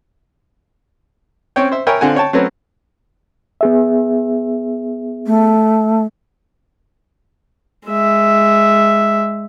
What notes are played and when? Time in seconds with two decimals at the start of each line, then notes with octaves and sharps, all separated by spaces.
1.56 C4 C#4 C#5 G5
1.72 C5 E5
1.87 A#4 C#5 E5 G5 G#5 B5
2.01 D3 C4 F4 F#5 G#5
2.16 C#5 G5 A5
2.33 F#3 A3 C4 C#4 B4 C#5
3.61 B3 G#4 E5
5.26 A3
7.88 G#3 E5